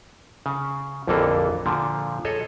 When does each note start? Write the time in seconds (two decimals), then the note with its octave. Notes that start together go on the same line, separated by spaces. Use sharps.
0.46 C#3
1.07 A#1 F2 D3 E3 A#3 A4
1.66 A#2 D3 F3
2.25 G#4 A4 C#5 D#5